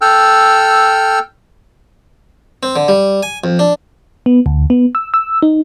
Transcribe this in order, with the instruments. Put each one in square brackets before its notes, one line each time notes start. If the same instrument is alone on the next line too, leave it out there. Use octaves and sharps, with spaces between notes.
[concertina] A4 G5 E6 F6
[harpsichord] C4
D3
G3
G#5
F2
D4
[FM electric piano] B3
D2
B3
E6
E6
D#4